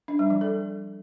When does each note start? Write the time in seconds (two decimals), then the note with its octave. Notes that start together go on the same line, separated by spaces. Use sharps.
0.08 D4
0.19 G3
0.30 F3
0.41 A4